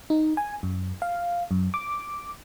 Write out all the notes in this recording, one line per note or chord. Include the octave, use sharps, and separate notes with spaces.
D#4
G#5
F#2
F5
F#2
D6